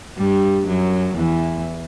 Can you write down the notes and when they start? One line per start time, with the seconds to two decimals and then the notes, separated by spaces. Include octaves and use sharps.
0.18 G2 G3
0.67 F#2 F#3
1.16 E2 E3